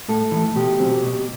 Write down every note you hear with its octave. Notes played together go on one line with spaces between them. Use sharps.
A2 A4
E3 A3
B2 G4
F#3 C4
B2